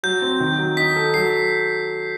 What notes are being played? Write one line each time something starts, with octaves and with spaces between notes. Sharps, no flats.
F#3 G6
C4
D#3
F#3
D#4 B6
A4
F#3 C7